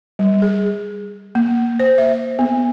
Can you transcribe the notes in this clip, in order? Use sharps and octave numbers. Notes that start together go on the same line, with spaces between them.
G3
G#4
A#3
C5
E5
B3